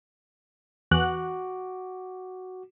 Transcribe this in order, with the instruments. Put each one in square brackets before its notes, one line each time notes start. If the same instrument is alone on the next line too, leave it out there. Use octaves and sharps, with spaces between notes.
[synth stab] E2 F#5 F#6 [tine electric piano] F#4 D6